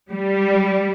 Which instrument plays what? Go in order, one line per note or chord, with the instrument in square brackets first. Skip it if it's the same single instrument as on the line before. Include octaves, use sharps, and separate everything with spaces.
[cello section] G3